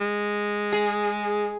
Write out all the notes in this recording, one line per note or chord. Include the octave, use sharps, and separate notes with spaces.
G#3
G#4